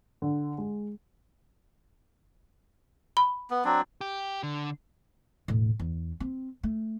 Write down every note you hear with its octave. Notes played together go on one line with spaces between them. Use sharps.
D3
G#3
B5
B3
F#3 C4 D4
G4
D3
E1 A2
E2
C4
A3